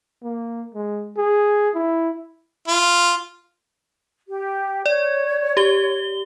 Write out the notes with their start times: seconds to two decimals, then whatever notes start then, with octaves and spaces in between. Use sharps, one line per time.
0.23 A#3
0.75 G#3
1.17 G#4
1.75 E4
2.68 F4
4.27 G4
4.86 C#5 D5
5.57 G4 G7